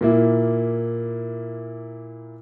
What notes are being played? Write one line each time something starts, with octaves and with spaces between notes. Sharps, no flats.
A#2 A#3 E4